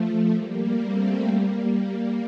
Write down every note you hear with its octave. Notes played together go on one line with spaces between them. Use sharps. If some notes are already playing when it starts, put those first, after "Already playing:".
Already playing: F3 A3
G3 A#3
A3 C4
G3 A#3